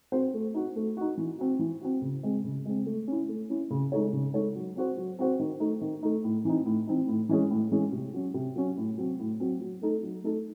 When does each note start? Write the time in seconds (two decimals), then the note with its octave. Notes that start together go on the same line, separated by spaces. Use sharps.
0.12 C4 F#4 C5
0.34 A3
0.54 D#4 F#4
0.76 A3
0.97 D#4 F#4
1.18 E3
1.39 C4 F#4
1.59 E3
1.81 C4 F#4
2.02 C#3
2.23 G#3 C4
2.44 C#3
2.66 G#3 C4
2.86 A3
3.08 C#4 E4
3.28 A3
3.50 C#4 E4
3.71 C#3
3.92 G#3 D#4 A4 C#5
4.13 C#3
4.34 G#3 D#4 A4 C#5
4.55 F#3
4.76 C4 F#4 C5
4.97 F#3
5.19 C4 F#4 C5
5.39 D#3
5.60 A3 D#4
5.81 D#3
6.03 A3 D#4
6.24 A2
6.45 E3 C4 D#4
6.66 A2
6.87 E3 C4 D#4
7.08 A2
7.29 E3 G#3 C#4 G#4
7.50 A2
7.72 E3 G#3 C#4 G#4
7.92 C3
8.13 F#3 C#4
8.34 C3
8.56 F#3 C#4
8.77 A2
8.98 F#3 C4
9.19 A2
9.40 F#3 C4
9.61 F#3
9.82 A3 D#4 A4
10.03 F#3
10.24 A3 D#4 A4